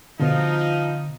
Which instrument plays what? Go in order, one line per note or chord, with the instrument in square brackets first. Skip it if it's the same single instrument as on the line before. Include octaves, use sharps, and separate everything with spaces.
[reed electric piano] B2 D3 [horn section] F3 D#4